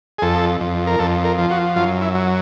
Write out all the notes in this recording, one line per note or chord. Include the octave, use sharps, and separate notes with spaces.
G#4
F2 A4
F2
A#4
F2 A4
A#4
F3
F#4
F#2 F4
E4
F#3